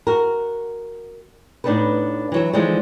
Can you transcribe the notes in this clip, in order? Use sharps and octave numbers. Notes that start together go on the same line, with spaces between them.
F#4 A#4
A2 B3 D4 D#4 A4 B4
E3 F#3 E5
D3 E3 F3 G#3 D#4